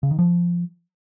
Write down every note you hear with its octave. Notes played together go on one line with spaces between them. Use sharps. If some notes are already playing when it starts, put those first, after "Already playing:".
C#3
D#3
F3